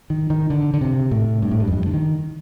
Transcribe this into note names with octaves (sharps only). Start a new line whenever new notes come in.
D#3
D#3
D3
D3
C3
A2
G2
A2
G2
F2
G2
D3
D#3